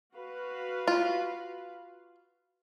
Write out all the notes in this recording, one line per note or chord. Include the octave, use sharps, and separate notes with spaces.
F#4 B4 F5
F4